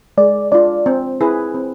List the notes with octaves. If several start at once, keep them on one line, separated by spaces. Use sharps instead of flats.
G#3 D5
D4 F4 D5
C4
E4 G#4 B4
C4